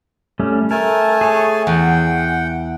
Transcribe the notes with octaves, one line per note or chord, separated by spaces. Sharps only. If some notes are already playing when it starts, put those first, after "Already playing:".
G3 A3 C#4
A3 A#4 G#5 A5
G#4 C#5
E2 F#5 G5